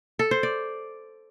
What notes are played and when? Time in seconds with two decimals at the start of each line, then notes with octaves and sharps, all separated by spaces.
0.19 A4
0.31 C5
0.43 D5